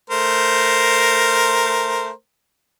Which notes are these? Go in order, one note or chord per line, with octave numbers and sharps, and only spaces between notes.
A3 A#4 C5